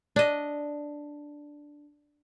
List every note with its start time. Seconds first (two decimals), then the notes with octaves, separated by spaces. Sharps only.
0.16 D4 D#5